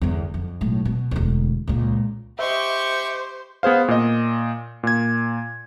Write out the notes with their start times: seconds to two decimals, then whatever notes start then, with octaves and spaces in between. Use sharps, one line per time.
0.01 G1 E2
0.34 F2
0.61 B1 A2
0.85 B2
1.11 E1 D2
1.67 C#2 A#2
2.39 G4 C5 D#5 E5 C#6
3.63 B3 G#4 C5 F5
3.88 A#2 D#5
4.83 A#2 G#6